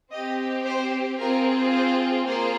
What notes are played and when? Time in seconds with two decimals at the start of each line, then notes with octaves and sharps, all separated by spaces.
0.12 C4 G4 D#5
0.65 C5
1.19 C4 F4 G#4 A#4
1.72 C5
2.26 A#3 F4 G#4 C5